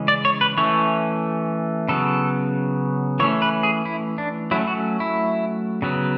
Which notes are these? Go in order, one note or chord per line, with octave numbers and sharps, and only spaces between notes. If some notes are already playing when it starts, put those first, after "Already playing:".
Already playing: C#3 E3 G#3 C#4
D5
C#5
B4
E3 A3 C#4 C#5
C#3 F#3 B3 A4
E3 A3 C#4 C#5
B4
G#4
E4
D4
F#3 A3 C#4 E4
F#4
E4
C#3 F#3 B3